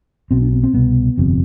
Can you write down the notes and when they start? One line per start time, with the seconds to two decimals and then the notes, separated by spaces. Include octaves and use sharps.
0.31 B1 B2 C4
0.42 D4
0.52 C4
0.63 C4
0.73 C2 B2 B3
1.17 G1 F2 C3